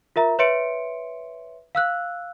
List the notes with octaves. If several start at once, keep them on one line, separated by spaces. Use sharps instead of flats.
F4 A#4 E5 A#5
B4 C#5 E5 C6 C#7 D7
F5 E6 F#6